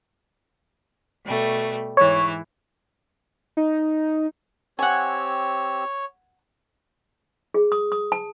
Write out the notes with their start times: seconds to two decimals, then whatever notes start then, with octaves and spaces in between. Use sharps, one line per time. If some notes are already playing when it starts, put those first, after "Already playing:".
1.25 B2 G3 A3
1.97 G#2 E3 C#5
3.57 D#4
4.79 C4 G4 C#5 F#5 G#5 E6
7.54 G#4
7.72 D#6
7.92 D#6
8.12 A5